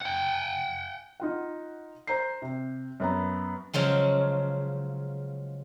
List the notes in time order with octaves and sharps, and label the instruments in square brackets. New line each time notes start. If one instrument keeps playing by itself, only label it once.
[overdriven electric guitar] F#5 G5
[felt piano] D#4 F4 F#5
C5 A#5 G6 C7
C3
F#2 B3 A#5
[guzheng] C#3 F3 F#3 G#3